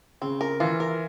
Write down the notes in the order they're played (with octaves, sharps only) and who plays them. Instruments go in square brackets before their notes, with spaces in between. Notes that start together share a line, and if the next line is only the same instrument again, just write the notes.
[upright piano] C#3 [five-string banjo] C4
[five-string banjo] A#4
[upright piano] E3 [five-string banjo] F4
[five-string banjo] A#4